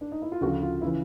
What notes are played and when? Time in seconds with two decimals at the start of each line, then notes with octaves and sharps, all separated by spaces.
0.01 D4
0.12 D#4
0.22 E4
0.32 F4
0.41 D2 C#3 F3 F#4
0.62 F4
0.82 E4
0.85 C#3 E3